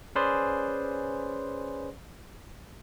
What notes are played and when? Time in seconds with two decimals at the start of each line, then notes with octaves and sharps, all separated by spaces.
0.15 C#4 G#4 B4 C5 D5 C6